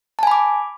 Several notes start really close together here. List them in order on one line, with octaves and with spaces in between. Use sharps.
A5 G#5 B5 D6